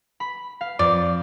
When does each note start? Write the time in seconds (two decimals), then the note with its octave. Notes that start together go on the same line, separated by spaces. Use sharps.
0.20 B5
0.61 F5
0.79 F2 D5